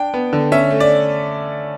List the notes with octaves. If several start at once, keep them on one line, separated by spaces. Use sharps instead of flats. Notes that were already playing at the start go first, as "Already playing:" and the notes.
Already playing: D4 G5
B3
D3
C#4 E5
A3
D5